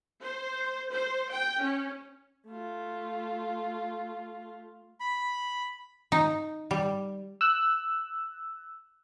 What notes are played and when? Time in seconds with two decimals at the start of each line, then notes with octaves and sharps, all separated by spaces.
0.22 C5
0.91 C5
1.29 G5
1.61 C#4
2.47 A3 F4
5.00 B5
6.12 D#4
6.71 G3
7.41 E6 F#6